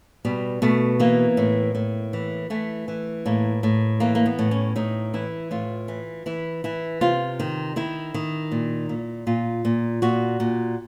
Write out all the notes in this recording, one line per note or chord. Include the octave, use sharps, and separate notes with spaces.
B2 G3
B2 A3
E3 A#3
A2
A2
E3
E3 A3
E3
A2 A#3
A2
E3 A#3
A#3
B3
A2
C#4
A2 D#4
E3 E4
A2 F4
E3
E3 E4
E3 E4
C3 F4
D#3
D#3 E4
D#3
A#2
A#2
A#2 F4
A#2
A#2 F#4
A#2